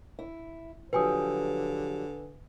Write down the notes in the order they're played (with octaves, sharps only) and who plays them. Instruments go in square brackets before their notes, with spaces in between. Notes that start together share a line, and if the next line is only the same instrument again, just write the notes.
[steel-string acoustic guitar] E4
[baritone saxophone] D3 [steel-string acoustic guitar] F3 F#3 G4 [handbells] B4 G#5 D#6